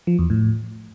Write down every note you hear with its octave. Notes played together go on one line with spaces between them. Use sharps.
F3
E2
A2